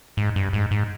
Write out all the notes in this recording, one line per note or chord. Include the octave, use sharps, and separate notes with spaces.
G#2
G2
G#2
G#2